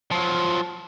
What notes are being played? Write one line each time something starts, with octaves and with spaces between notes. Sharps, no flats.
F3 F#3